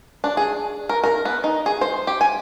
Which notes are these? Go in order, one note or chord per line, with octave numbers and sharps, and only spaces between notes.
D4
G#4
A#4
A#4
B3
D#4
G#4
C5
G4
G#5